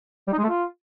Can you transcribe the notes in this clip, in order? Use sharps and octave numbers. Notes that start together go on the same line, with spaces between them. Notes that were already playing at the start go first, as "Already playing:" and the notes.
G3
D#4
G#3
A3
F4